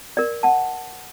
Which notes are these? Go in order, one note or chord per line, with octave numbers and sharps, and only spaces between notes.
A#4 D5
F#5 A5